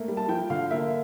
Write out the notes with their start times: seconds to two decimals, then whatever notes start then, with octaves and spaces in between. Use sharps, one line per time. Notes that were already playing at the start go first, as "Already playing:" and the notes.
Already playing: A3 A#3
0.08 G3
0.17 A5
0.28 F3 G5
0.50 D3 F5
0.71 A#3 E5